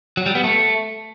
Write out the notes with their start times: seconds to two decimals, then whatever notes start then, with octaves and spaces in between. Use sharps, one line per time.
0.17 F#3
0.26 G3
0.35 B3
0.44 A3